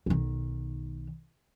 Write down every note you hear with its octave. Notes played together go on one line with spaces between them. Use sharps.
B1 D#3